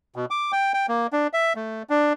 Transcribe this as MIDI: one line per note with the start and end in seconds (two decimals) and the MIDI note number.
0.16 0.25 47
0.30 0.52 86
0.52 0.72 79
0.74 0.86 79
0.89 1.07 58
1.13 1.27 62
1.33 1.53 76
1.56 1.83 57
1.90 2.13 62